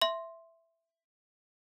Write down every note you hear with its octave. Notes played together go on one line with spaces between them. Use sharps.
E5 C6